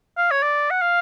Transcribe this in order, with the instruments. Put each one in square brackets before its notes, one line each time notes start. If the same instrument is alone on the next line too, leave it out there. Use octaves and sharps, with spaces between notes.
[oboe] F5
C#5
D5
F#5
F5